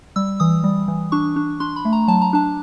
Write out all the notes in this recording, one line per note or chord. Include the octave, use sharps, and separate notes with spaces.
G3 E6
E3 D#6
G3
E3
D4 C#6
D4
D4 C6
B5
A3
A#5
F#3 A5
A#5
D4 A5